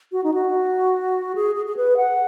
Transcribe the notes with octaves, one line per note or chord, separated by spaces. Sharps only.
F#4
D#4
F#4
G#4
G#4
G#4
B4
F#5